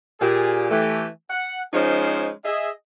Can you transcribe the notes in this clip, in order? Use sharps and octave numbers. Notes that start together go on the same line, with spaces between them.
A#2 G4 G#4
E3 A3 G4
F#5
F3 G#3 C#4 D#4 G#4 C5
G#4 D#5 E5